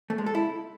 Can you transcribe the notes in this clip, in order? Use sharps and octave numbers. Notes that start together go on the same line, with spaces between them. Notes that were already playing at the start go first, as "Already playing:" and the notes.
A3
G#3
A4
E4